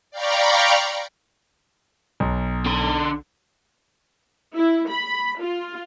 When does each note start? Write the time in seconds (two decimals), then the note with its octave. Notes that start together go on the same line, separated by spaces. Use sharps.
0.11 D5 F5 G5 A#5 B5 C#6
2.20 B1
2.66 D3 C6
4.55 E4
4.90 B5
5.40 F4